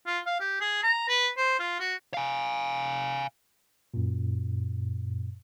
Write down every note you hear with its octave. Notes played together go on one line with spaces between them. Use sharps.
F4
F5
G4
G#4
A#5
B4
C5
F4
F#4
F5 G#5
F#2 A#2